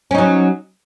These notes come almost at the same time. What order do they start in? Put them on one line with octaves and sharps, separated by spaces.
C#4 D#4 F#3